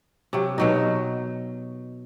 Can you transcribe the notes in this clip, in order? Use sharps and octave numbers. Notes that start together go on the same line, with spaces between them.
C3 F#3
B2 F#3 D#4